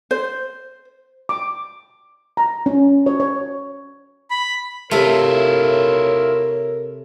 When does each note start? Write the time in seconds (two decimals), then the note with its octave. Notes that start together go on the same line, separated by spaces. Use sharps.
0.11 C5
1.29 D6
2.37 A#5
2.66 C#4
3.06 C#5
3.20 C#5
4.31 B5
4.91 C3 A3 E4 F4 A#4 C#5